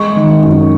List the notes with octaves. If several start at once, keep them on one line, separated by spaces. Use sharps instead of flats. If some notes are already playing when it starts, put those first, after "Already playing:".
Already playing: G#3 C#6
D#3
F#2